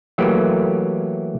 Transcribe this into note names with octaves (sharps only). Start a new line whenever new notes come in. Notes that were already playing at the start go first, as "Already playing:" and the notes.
E3 F#3 A3 A#3 G4